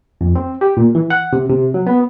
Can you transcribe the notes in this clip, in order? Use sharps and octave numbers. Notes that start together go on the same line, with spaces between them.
F2
C4
G4
A#2
E3
F#5
C3
C3
F#3
B3